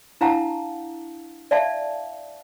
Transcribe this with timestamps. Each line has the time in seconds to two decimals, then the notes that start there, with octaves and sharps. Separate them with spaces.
0.21 D4 E4 F5 F#5 A5 A#5
1.51 D5 E5 F5 A5